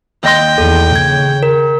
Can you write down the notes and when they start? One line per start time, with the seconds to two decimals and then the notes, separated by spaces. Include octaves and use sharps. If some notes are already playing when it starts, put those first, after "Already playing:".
0.24 D#2 D#5 G5 C6
0.58 E2 A4
0.96 C#3 G#6
1.43 A#4